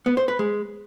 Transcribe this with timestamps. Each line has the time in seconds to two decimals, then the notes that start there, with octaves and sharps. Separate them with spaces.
0.06 B3
0.17 C5
0.28 B4
0.39 G#3